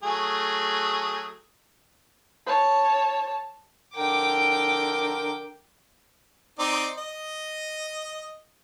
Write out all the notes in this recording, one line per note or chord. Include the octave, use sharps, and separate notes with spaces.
F#3 A3 G#4
C#5 A5
D3 A#4 G5 D6
C4 D#4 D5
D#5